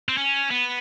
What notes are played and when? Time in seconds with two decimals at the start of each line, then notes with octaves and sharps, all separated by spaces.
0.09 C4
0.17 C#4
0.50 B3